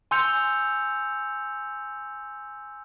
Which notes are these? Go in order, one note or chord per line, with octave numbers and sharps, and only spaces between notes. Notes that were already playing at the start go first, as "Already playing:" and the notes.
G#5 C6 E6 G6 C#7 F7